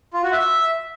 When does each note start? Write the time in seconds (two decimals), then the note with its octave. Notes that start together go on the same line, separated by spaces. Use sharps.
0.13 F4
0.23 F#4
0.33 E5